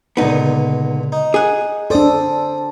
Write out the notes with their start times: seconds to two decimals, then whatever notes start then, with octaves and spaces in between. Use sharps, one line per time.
0.17 C#2 A#2 D3 B3 D#4
1.12 D#4
1.34 G#4 F#5
1.90 C4 D4 A4 D5 D#6